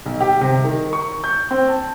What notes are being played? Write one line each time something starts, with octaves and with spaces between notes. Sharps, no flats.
B1
G4
C3
D#3
C#6
G6
C4
A5